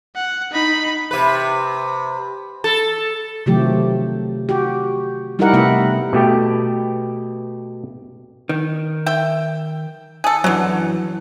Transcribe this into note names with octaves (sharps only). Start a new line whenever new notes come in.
F#5
D#4 B5
C3 B4
A4
C3 D#3 F3 F#3 A3 G4
F#4 G4
G3 D#4 E4 G4 A#4 F#5
C3 A3 B3 E5 F#5
B2 A3 G4 G5
D#3
E5 G5
G#4 A4
F#2 D3 E3 F#3